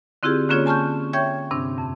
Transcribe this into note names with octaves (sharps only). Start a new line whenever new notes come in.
D3 C4 E4 F4 G4 G#4
D3 A#3 C#4 F4 G#4 C#5
G#5 A5 C#6 F6 G6
C#5 E5 G5 C#6 G6 G#6
G2 C3 C4 D4
F2